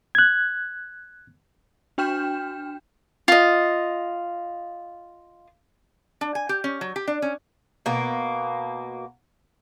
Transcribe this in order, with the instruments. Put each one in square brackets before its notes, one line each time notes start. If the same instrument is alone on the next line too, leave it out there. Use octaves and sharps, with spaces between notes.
[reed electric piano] F#6 G#6
[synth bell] D4 F#4 G5 F6 G6 E7
[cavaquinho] F4 D#5
[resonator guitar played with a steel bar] D4
G#5
G4
C#4
F#3
G4
D4
C#4
[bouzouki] B2 A#3